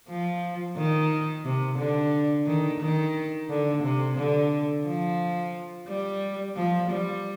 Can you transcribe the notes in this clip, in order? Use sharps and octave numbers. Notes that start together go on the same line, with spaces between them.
F3
D#3
C3
D3
D#3
D#3
D3
C3
D3
F3
G3
F3
G3